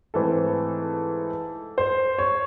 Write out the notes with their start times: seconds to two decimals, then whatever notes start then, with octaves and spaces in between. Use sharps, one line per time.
0.14 G#2 E3 A3 C4 A4
1.78 C5
2.18 C#5